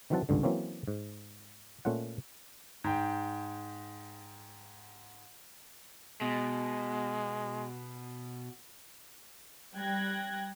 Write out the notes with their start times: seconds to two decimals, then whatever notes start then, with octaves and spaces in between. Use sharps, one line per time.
0.10 D#3 E3 F#3 C4 F#5 A5
0.29 G#1 C#2 G2 D3
0.43 E3 F#3 A#3 C4 C#4
0.88 G#2
1.85 A#2 A3 C#4 F4 F#5
2.84 G#2 G5
6.21 B2 G#3
9.75 G3 G5 F#6 G#6 A#6